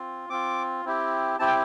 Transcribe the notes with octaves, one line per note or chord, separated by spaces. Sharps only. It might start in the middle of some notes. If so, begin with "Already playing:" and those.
Already playing: C4 F4
C4 F4 D6
C4 E4 G4
C4 E4 G4 A5
G5